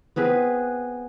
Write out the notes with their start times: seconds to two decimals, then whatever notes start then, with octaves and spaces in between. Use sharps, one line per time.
0.16 B3 C4 G#4 B4